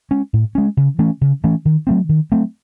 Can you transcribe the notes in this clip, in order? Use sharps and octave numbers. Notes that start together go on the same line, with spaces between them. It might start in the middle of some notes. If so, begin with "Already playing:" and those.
G#3 C#4
A2
G#3 C#4
C#3
E3 A3 C#4
C#3
E3 A3 C#4
D#3
F#3 A3 C4
D#3
F#3 A3 C4